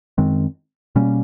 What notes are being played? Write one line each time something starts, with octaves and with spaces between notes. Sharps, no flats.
F#2 D#3 G#3 C4
B2 G3 A#3 C#4